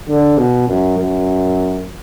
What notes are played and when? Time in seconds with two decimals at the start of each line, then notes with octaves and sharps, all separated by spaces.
0.08 D3
0.38 B2
0.68 F#2
0.98 F#2